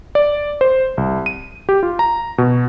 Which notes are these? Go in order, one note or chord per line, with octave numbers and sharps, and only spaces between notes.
D5
C5
C2
D#7
G4
F4
A#5
B2